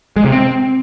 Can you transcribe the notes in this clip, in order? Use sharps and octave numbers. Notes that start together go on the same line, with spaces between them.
G#3
C3
C4